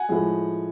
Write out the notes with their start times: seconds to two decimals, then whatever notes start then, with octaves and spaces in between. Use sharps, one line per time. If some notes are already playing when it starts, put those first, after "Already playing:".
Already playing: F#5 G#5
0.09 A2 F3 G#3